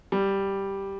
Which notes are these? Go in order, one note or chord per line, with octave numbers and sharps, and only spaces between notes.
G3